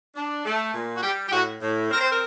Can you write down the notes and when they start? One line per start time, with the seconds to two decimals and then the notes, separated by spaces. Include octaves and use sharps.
0.16 D4
0.45 A3
0.74 A#2
0.96 F#4
1.02 G3 G4
1.28 G4
1.31 A2 F#4
1.61 A2
1.90 C4 A#4
2.00 C5
2.10 A#4